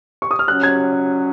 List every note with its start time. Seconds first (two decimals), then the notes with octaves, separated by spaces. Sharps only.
0.22 C#6
0.31 D#6
0.39 F6
0.48 F#3 C#4 F#6
0.63 G#6